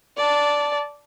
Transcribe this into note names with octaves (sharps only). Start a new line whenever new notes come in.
D5 A5